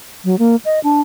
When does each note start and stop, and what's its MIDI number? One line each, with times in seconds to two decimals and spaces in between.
0.25 0.38 54
0.39 0.56 58
0.65 0.80 75
0.84 1.01 62